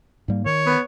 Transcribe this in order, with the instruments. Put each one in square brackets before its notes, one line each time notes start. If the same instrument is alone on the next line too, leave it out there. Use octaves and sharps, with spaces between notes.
[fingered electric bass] G#2 G3 A#3
[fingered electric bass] D#3 [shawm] C#5
[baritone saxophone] B3